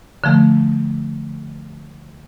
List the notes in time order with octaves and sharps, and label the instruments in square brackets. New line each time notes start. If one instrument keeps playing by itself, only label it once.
[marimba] D3 F3 A3